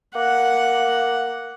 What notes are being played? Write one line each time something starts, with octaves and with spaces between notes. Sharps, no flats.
A#3 F#5